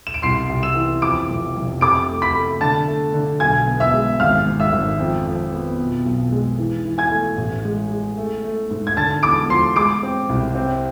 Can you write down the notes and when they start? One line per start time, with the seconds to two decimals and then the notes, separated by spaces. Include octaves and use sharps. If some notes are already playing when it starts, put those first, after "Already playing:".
0.07 E7
0.14 D7
0.22 C2 C6 C7
0.49 C2
0.63 E6 E7
0.76 E3
1.02 F2 D6 D7
1.29 F1
1.56 F1
1.81 C3 D6 D7
2.08 A3
2.22 B5 B6
2.35 A3
2.61 D3 A5 A6
2.87 A3
3.14 D3
3.40 B1 G#5 G#6
3.67 B3
3.80 E5 E6
3.94 G#3
4.20 G#1 F5 F6
4.46 G#2
4.60 E5 E6
4.72 G#1
4.99 F2
5.27 F2
5.52 B3
5.79 B2
6.05 B1
6.32 G#3
6.59 E3
6.85 E3
6.98 G#5 G#6
7.11 A3
7.37 A1
7.65 G#3
7.90 G#3
8.17 A3
8.44 A3
8.70 G#2
8.87 G#6
8.97 D3 A5 A6
9.23 E2 D6 D7
9.49 F3 C6 C7
9.76 G#3 D6 D7
10.03 C4
10.29 C2
10.55 C4